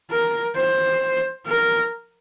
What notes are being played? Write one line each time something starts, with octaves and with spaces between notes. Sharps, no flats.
A#4
C5
A#4